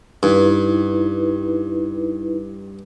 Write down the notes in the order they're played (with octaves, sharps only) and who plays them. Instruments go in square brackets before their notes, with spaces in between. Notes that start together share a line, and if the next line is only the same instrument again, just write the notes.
[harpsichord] G2 [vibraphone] D#4 E4 B4